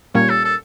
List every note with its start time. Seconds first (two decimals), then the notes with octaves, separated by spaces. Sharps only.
0.14 A#2 G3 A#3 C#4 C#5
0.29 A4
0.45 A4